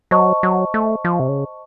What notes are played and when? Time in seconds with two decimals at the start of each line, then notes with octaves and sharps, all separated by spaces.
0.11 F#3 C5 D#5 A5 C#6
0.43 F#3
0.74 A3
1.05 F3
1.20 C3
1.28 C#3